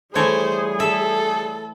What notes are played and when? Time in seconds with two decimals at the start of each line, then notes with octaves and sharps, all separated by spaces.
0.15 E3 G3 A3 G#4 C5 C#5
0.80 A4 E5